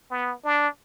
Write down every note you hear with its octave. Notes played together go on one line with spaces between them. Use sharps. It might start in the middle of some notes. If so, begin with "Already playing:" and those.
B3
D4